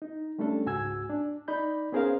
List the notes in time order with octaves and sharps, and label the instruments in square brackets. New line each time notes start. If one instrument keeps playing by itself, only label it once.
[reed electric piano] D#4
G3 A3 C#4 D4 A4
C#2 G#2 F#4 G#5 E6 G#6
D4
D#4 D5 B5 G6
B3 C#4 G#4 A#4 C5 F5